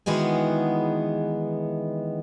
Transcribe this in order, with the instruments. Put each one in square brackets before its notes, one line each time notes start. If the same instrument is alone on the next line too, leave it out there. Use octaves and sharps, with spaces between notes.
[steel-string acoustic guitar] D#3 E3 G#3 B3 F#4 G#4